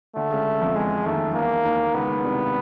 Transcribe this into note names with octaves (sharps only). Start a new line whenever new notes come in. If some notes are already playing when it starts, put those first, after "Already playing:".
D2 D3 A3
C#2 C#3
F2 F3
E2 E3 G#3
D#2 D#3 A3
F3
E2 E3 A#3
D#2 D#3
C#2 C#3 B3
C2 C3